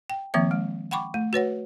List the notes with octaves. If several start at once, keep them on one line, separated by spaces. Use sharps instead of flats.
G5
D#3 F3 A#3 C4 E5
G#3
F#5 G5 B5 C#6 D6
A3
F#4 B4 C#5 F#5